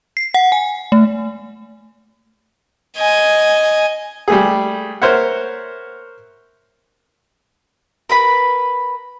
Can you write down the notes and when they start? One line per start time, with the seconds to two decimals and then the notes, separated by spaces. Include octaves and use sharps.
0.17 C7
0.34 F#5
0.52 G#5
0.92 A3
2.97 D#5 G#5
4.28 G3 A3 G#4
5.02 A#4 C5 C#5 E5 F#5
8.09 A#4 B4 B5